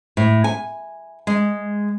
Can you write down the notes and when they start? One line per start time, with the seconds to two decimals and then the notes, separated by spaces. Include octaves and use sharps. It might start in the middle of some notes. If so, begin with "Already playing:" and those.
0.17 A2
0.44 G#5
1.27 G#3